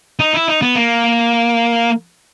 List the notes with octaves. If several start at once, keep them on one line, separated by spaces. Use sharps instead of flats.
D#4
E4
D#4
B3
A#3